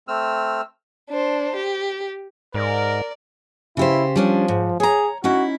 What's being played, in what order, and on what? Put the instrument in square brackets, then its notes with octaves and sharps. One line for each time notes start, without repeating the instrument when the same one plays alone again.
[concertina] A3 C4 E6 F6
[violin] D4 C5
G4
[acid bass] G#2 [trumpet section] A#4 [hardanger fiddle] D5
[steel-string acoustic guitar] C#3 G4 C5 [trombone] E4
[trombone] F3 [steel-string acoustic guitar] G3 C#4 D4
[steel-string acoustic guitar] G#2
[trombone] G#4 [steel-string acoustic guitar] C#5 A#5
[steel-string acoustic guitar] C#4 D#4 E4 [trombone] F#4